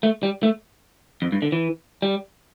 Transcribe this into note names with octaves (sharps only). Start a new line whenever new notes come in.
A3
G3
A3
F2
G2
D3
E3
G3